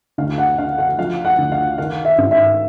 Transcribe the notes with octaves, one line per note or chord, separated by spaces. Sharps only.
D2 F5
F#5
D3 F5
F#5
F3 F5
F#5
D2
F5
D#3 F5
E5
G#2
E5